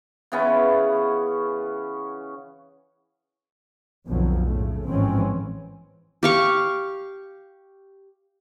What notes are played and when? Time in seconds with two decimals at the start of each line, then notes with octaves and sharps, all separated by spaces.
0.32 C#3 E3 B3 C#4
4.07 B1 F2 B2 D3 F3 F#3
4.46 A2 C#3 A3
4.89 A1 G#2 E3 F3 C4 C#4
6.23 G4 F5 C#6